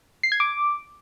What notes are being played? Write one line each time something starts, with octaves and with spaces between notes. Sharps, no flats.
C7
G#6
D6